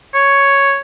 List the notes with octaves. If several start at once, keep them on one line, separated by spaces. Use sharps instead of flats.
C#5